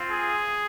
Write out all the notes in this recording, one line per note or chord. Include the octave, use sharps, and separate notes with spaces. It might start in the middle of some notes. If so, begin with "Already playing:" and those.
Already playing: C4 F4
G#4